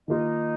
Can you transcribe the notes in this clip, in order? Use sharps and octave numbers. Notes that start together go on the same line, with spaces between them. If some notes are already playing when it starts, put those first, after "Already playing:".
D#3 A#3 D#4 F4 D#5